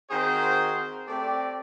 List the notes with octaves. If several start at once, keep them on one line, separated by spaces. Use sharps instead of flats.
D#3 C4 F#4 G#4 A#4 C5
A3 C4 G4 D5